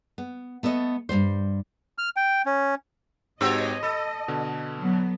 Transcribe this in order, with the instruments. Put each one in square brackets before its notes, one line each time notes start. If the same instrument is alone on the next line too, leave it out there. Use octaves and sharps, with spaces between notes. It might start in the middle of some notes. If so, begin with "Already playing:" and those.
[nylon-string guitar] B3
A3 B3 A4 D5 D#5
G2 A#2 G3 C5
[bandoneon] F6
G5
C#4
[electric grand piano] G#2 F#4 G4 [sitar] B3 C#5 [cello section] D#5
[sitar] A4 [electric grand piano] B5
[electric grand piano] B2 D3
[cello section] F#3 B3